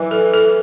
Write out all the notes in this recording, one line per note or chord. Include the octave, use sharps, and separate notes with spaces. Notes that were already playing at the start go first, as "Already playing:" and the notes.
Already playing: E3 F#3
A4
A4